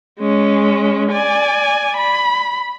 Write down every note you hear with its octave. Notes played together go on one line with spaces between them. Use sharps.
G#3 C#4
D5 G#5
B5